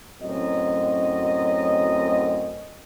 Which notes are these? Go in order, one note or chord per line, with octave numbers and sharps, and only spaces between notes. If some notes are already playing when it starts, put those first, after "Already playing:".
F#2 A2 F#3 C4 D#5